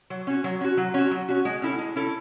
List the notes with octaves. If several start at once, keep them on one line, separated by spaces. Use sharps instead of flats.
F#3
C#4 F#4
F#3
C#4 F#4
F#3
C#4 F#4
F#3
C#4 F#4
G#3
C#4 E4 A4
G#3
C#4 E4 A4